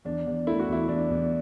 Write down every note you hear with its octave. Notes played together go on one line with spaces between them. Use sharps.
E2 D4
E2
A3 E4
F#4
E2 E4
E2 D4
E2